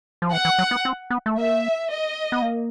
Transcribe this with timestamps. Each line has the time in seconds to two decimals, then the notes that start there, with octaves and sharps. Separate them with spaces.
0.22 F3
0.32 E3 F#5
0.45 E3
0.59 F#3
0.71 B3
0.85 C4
1.10 B3
1.26 A3
1.36 A#3 E5
1.90 D#5
2.32 B3
2.42 A#3